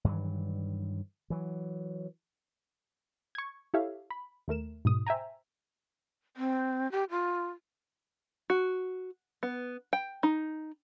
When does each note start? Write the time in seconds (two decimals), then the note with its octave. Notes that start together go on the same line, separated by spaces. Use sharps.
0.04 G2 D#3 E3 F#3
1.30 E3 F#3
3.35 C#6 G#6
3.74 E4 G4 A4 C#5 E5 F5
4.10 B5
4.48 D#2 A3 A#4 E7
4.85 G#2 B2 D#6
5.07 C5 E5 G5 G#5 A#5
6.37 C4
6.92 G4
7.11 F4
8.50 F#4
9.43 B3
9.93 G5
10.23 D#4